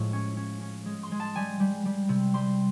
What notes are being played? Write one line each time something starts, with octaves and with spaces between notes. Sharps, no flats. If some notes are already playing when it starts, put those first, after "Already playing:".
Already playing: A2 F3 G#3
C#4
C#4
C#4
G#3
C6
G#3
A5
G3 G#5
G3
G3
C3
G3 C6